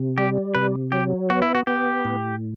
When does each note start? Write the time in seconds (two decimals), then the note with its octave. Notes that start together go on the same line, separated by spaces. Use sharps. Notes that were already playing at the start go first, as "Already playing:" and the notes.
Already playing: C3
0.18 G3 G4
0.55 C3 B4
0.92 F#3 G4
1.30 B3 F#4
1.42 E4
1.55 F#4
1.67 B3 G4
2.05 A2